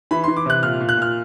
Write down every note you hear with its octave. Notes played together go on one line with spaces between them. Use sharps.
E3 B5
C6
E3
D6
C3 F#6
A#2 F6
A#2
F#6
A#2 F6